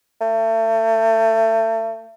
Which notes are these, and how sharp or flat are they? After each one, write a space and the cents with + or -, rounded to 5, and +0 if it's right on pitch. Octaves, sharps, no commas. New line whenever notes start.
A3 +30